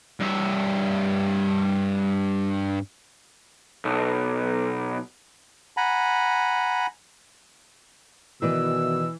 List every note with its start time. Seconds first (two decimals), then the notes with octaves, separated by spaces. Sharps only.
0.20 G2 E5
3.85 B1
5.77 F#5 G#5 A#5 B5
8.42 B2 D#3 E3 B4 D5 E6